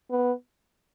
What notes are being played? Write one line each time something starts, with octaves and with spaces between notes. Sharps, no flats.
B3